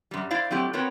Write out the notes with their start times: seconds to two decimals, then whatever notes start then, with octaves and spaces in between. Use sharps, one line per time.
0.11 F#2 G3
0.31 E4 C5 D5 F5
0.51 F#3 A3 C4 E4 G4
0.73 B3 C4 F#4 A#4 B4 C#5